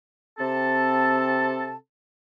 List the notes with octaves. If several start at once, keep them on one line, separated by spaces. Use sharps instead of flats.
C3 C4 A4 A5